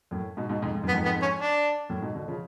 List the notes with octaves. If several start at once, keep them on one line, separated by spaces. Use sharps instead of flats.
F#2 A2
G#2 B2
G#2 B2
F2 G#2
G#2
F#2
B3
F2 G#2
B3
C#4
D4
F#2 A2
G#2 B2
B2 D3
C#3 F3